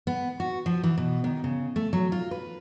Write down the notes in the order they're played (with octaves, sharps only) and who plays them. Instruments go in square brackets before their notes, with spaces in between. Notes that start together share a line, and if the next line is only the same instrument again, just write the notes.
[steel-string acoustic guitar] B3
F#4
F3
E3
B2
D#3
C#3
A3
F#3
F4
B4